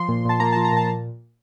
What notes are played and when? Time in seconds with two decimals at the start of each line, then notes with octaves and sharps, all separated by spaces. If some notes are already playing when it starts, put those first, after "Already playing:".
Already playing: F3 C6
0.09 A#2
0.25 A#2 A5
0.40 A#3 A#5
0.53 F3 A5
0.65 A#5
0.72 A#2 A5